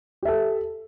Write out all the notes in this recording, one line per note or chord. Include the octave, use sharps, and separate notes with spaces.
G4 A4 E5